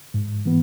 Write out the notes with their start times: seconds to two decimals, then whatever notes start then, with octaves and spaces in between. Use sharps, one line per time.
0.14 G#2
0.46 E3 B3